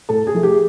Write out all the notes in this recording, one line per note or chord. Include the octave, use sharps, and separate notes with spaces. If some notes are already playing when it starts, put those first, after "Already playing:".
A2 A4
G#4
F3 A3
G4